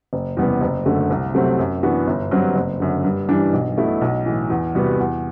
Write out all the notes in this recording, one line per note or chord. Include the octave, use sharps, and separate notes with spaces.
F#1
E2 C3 G3 B3
F#1
F#2 D3 A3
C2
C3 F#3 A3 C4
F#2
E3 B3 D4 F#4
G1
G2 F#3 C4
F#1
F#2 D3
G2
E3 G3 D4
B1
B2 A3 E4
B1
A2 E3
E2
C3 G3 B3 F#4
E2